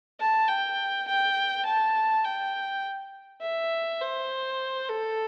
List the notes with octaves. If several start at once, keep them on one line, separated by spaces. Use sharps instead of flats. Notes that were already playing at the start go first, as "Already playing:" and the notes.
A5
G5
G5
A5
G5
E5
C5
A4